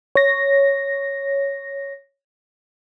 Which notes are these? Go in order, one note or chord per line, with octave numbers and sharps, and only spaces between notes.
C#5 A#6